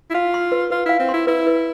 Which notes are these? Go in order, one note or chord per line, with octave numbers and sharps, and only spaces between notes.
E4
F4 F5
C6
B4
F4 B4
E4 F5
C4
C6
E4
E4 B4
B4